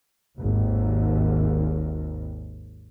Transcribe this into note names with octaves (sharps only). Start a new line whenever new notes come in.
G#1 D#2